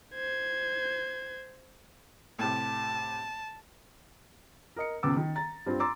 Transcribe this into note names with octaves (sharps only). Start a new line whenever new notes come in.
C5 G#6
A2 C3 A5
A#4 D#5 C#7
D#1 C#2 B3 D6 E6 A6
D#3
A#5 A6
G2 C4 F4
A#5 C6 D6 E6 A6